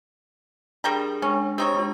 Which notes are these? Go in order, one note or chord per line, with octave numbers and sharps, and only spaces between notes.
G3 D4 G#4 A#4 G5 A#5
G#3 C#4 D4
C4 D#4 G4 C#5 D#6 A#6
G#3 D4 F4